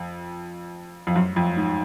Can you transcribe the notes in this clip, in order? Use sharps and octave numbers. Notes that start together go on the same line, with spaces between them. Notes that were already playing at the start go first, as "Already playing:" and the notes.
Already playing: F2
F2
F#2
F2
G#2